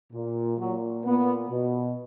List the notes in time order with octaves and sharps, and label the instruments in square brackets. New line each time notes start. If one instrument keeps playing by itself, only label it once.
[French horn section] A#2
A#2 F#3
A#2 B3
B2